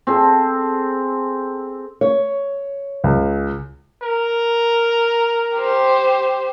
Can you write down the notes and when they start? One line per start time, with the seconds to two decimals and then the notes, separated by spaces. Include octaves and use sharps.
0.07 C4 G#4 A4
2.01 C#5
3.04 C#2
4.02 A#4
5.57 G4 C5